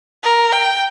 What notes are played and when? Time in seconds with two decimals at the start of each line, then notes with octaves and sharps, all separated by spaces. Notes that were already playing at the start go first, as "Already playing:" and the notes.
0.23 A#4
0.53 G5